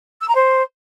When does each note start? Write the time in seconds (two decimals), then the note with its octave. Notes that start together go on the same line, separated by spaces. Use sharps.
0.21 E6
0.28 A#5
0.35 C5